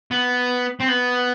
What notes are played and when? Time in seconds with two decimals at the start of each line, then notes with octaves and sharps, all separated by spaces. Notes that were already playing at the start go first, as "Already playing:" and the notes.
0.11 B3
0.81 C4
0.89 B3